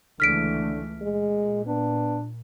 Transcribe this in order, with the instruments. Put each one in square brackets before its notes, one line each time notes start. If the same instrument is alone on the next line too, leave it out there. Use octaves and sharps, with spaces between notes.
[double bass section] C#2 E3 A3 [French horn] D3 [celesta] F6 B6 D7
[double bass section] A#2 [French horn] G#3
[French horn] B3 [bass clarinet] D4